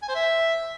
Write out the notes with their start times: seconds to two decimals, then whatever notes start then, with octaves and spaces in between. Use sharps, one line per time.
0.03 G#5
0.09 C5
0.15 E5